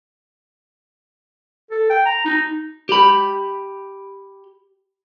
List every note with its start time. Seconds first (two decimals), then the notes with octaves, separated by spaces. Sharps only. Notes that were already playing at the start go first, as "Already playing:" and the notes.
1.71 A4
1.90 G5
2.05 A#5
2.25 D#4
2.89 G4 B5